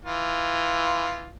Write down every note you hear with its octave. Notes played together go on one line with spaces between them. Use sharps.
E3 F4